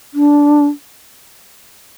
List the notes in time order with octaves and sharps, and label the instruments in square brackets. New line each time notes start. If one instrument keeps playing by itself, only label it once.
[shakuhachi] D4